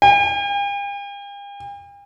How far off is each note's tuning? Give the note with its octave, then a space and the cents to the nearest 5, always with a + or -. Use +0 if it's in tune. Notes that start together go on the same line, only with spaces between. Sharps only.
G5 +45